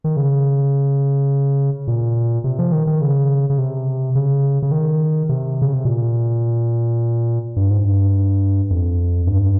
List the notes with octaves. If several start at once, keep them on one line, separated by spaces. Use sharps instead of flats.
D#3
C#3
A#2
C3
F3
D#3
D#3
C#3
C#3
C3
C#3
C#3
D#3
C3
C#3
C3
A#2
G2
G#2
G2
F2
G2